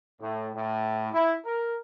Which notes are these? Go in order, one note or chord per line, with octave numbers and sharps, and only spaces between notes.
A2
A2
E4
A#4